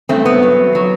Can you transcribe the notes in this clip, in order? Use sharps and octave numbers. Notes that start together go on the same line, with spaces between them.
G2 A3 C4
B3
F#3
F#3